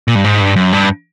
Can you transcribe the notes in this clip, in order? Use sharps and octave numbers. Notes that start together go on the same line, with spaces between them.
A#2
G2
G#2
G2
F#2
G2